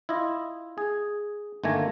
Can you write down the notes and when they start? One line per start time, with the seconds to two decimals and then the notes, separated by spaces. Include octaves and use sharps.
0.09 E4 F4 D#5
0.78 G#4
1.64 G1 D#3 A3 A#3 G#5 A#5